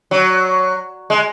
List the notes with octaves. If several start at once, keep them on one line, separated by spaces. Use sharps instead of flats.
F#3
G#3